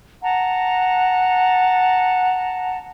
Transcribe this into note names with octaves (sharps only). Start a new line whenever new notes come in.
F#5 A5 A#5